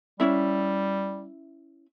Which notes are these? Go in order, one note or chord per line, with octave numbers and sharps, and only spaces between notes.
G3 C#4 E4 E5